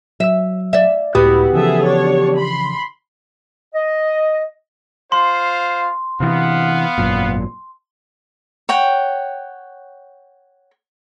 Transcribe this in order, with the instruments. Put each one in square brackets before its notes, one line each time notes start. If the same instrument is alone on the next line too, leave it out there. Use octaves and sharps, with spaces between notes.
[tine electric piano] F#3 E6 [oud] E5
[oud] D5 E5
[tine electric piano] C#2 A2 D#6 [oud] B3 F#4 [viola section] E4 [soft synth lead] G4
[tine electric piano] C#3 E3 F3 [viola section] G#4 A4 E5
[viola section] D4 C#5
B5 C6
[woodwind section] D#5
[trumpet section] F4 C5 F5 [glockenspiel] C6
[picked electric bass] C3 E3 [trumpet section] B3 F5
[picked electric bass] G#1 F#2 A#2
[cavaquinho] C#5 F#5 G5